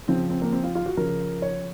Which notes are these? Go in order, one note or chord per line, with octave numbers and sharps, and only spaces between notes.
C#3 F3 C4
C4
A#3
C4
F4
F4
F#4
C#3 F3 A#4
C#5